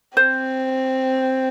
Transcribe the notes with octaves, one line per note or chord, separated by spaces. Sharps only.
C4 C5